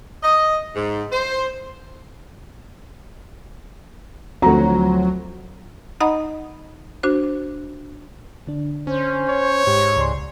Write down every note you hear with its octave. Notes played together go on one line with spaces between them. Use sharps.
D#5
G#2
C5
D2 F3 F#3 C4 F#4 A#5
D#4 D#5 F#5 A#5 B5 D#6
D4 F#4 C5
D3 D4
C#4 C5
C#5
G#2 G4
C#2 D5 C6